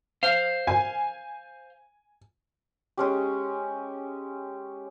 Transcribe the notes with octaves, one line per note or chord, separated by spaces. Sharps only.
C5 F5
G#5
G#3 C#4 G4